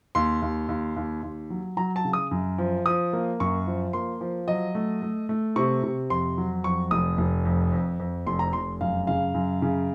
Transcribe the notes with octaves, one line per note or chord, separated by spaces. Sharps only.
D#2 C6
D#2
D#2
D#2
D#2
F#3
F#3 A#5
A5
C#3
D#6
F#2
F3
F3 D#6
A#3
F#2 C#6
F3
A#3 C6
F3
F#3 D#5
A3
A3
A3
C3 C#6
C3
F2 C6
F#3
F2 C#6
F1 D#6
F1
F2
F2
F2
F1 C6
A#5
F1 C6
F#2 F5
C#3 F5
F#2
C#3